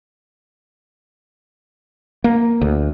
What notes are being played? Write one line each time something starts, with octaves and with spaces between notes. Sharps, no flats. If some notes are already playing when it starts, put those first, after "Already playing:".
A#3
D2